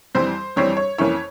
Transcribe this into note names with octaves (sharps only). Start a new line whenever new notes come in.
F2 E3 G3 C4 C5
F2 E3 G3 C4 C#5
C#5
F2 E3 A#3 C#4 E4 C#5